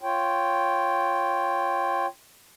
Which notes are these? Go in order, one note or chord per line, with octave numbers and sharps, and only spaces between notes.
F4 C#5 G5